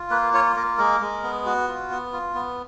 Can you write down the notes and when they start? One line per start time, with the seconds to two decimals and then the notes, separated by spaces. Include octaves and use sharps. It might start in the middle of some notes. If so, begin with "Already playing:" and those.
Already playing: F4
0.10 A#3 B4
0.34 F4 C#5
0.56 A#3 A#4
0.78 G#3 A#4
1.00 G#3
1.23 B3
1.45 F#4
1.68 F4
1.91 B3
2.13 F4
2.34 B3